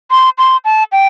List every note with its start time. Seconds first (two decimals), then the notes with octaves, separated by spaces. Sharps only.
0.11 C6
0.38 C6
0.65 A5
0.92 G5